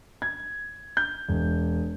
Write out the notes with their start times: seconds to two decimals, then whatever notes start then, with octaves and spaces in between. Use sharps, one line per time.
0.22 G#6
0.97 G6
1.28 E1